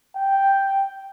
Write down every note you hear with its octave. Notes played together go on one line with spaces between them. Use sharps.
G5